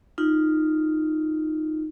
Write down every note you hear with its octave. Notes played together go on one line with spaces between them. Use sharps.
D#4 F4